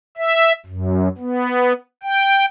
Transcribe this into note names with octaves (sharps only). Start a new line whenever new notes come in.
E5
F#2
B3
G5